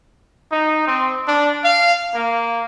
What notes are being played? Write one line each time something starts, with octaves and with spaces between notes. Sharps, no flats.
D#4
C4
D4
F5
A#3